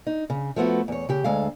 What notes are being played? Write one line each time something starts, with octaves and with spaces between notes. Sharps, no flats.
D#4
C#3
F3 A3 B3 F#4
E2 C#5
C#3 G4
D2 G#3 A4 F5